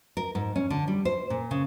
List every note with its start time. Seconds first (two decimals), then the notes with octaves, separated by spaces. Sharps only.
0.17 A#4
0.35 G#2
0.56 C#4
0.70 D3
0.87 G3
1.05 C5
1.30 A#2
1.51 C#3